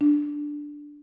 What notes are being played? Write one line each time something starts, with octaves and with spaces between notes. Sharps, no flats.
D4